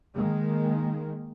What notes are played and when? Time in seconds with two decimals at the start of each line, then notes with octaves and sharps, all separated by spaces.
0.15 D#3 G#3 A#3